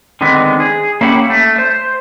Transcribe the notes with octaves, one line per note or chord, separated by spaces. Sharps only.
D3 D#3 G#3 B3 C4
G#4
A#3 C#4 E4 F#4 G4 F#5
A3
C5